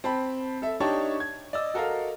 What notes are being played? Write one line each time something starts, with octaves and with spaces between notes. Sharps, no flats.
C4 A5 B5
A4 E5
D4 D#4 G4 C#5 A5 C#6
G#6
D5 D#5 E6
F#4 A4 A#4 D#5 F5